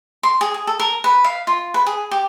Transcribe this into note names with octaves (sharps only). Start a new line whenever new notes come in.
C6
G#4
G#4
A4
A#4
B4
F5
F4
B4
G#4
G4